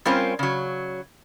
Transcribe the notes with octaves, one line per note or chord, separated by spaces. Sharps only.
G3 C4 C#4 F4 A#4 C5
C#3 F#3